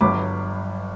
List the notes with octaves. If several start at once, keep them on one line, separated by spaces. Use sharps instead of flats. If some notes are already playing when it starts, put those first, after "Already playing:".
G1 G2 F#3 B5 D6